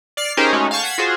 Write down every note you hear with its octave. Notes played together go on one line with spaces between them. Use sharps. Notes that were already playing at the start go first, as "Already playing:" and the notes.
D5 F6 C7
C#4 D#4 G4 G#4 A#4 C5
G#3 A3 C#4 D#4 F#4
F5 G#5 A5 C#6 G6
F#5 G#6 B6 C7 E7
F4 F#4 G#4 C5